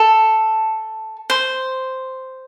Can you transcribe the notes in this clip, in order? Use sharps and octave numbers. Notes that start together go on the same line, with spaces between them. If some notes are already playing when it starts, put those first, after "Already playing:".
Already playing: A4
C5